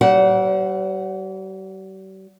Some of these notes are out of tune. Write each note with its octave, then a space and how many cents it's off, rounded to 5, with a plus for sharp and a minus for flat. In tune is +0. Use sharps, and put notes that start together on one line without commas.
G3 -45 C5 +0 F#5 +0